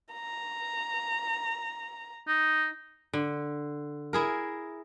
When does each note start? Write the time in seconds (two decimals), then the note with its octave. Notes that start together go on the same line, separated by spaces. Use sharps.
0.13 A#5
2.28 D#4
3.13 D3
4.13 E4 G#4 A#4